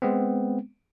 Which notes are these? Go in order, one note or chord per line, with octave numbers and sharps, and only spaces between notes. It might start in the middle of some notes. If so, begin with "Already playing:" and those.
G#3 B3 C4